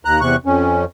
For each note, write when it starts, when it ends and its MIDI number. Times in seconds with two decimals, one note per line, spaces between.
0.05 0.21 39
0.05 0.21 82
0.05 0.21 90
0.21 0.36 40
0.21 0.36 48
0.21 0.36 85
0.21 0.36 90
0.46 0.85 41
0.46 0.85 61